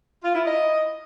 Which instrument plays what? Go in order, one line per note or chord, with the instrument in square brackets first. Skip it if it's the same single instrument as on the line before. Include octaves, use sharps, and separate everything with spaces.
[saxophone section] F4
E4
D#5